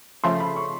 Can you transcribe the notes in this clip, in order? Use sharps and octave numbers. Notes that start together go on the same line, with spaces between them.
C#3 F3 A3 C6
B5
C#6